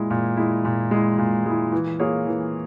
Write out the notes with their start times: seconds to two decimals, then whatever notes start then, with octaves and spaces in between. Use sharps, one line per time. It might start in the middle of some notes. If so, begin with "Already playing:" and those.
Already playing: A#2 G#3 E4
0.10 A#2
0.37 G#3 E4
0.65 A#2
0.91 G#3 E4
1.18 A#2
1.46 G#3 E4
1.72 E3
2.00 A#3 F4 G#4 C#5
2.27 E3